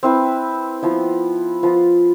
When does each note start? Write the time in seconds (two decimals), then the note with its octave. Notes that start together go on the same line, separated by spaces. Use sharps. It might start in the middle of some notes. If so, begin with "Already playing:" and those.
0.03 C4 E4 B4
0.83 F3 B3 E4
1.63 F3 B3 F4